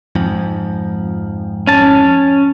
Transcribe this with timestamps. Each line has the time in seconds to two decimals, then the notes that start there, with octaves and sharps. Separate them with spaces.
0.16 F2 G#2 F3
1.67 C#4 A5